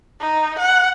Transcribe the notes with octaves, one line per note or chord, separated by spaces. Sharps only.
D#4
F#5